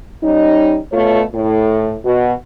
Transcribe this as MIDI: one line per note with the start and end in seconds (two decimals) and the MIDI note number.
0.23 0.77 55
0.23 0.77 61
0.23 0.77 63
0.92 1.23 47
0.92 1.23 57
0.92 1.23 65
0.92 1.23 73
1.34 1.93 45
2.05 2.33 47
2.05 2.33 66